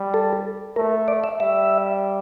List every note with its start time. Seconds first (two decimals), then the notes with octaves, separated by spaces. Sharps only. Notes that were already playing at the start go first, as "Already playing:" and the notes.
Already playing: G3
0.14 A4
0.76 A3 A#4
1.08 D5
1.24 E5
1.40 G3 E5